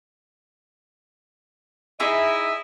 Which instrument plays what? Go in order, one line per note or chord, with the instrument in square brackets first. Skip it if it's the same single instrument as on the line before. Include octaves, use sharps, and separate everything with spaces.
[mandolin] D#4 G#4 E5 [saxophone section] E4 D#5